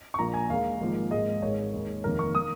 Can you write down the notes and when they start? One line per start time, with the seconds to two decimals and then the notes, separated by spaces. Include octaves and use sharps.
0.14 C#6
0.19 A#1 A#2 A#3 A#5
0.34 G#5
0.49 D#2 D#3 G#3 F5
0.80 G#1 G#2 F3 A#3
1.11 G#1 G#2 G#3 D#5
1.42 G#1 G#2 G#3 C#5
1.73 D#2 D#3 G#3
2.04 F1 D#2 D#3 A#3 A#4
2.19 C#6
2.34 D#3 A#3 D#6